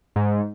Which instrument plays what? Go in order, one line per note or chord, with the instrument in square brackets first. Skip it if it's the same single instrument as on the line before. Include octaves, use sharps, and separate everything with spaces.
[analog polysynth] G#2